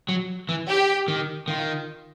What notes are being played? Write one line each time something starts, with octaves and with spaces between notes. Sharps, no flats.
F#3
E3
G4
D#3
D#3 F4